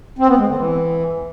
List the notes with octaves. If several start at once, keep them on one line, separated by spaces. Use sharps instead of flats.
C4
B3
G#3
D3
E3